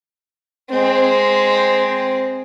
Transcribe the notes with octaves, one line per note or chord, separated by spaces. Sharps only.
G#3 C4